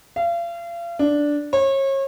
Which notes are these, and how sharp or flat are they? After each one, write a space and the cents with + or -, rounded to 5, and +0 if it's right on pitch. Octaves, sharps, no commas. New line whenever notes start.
F5 -35
D4 -5
C#5 -35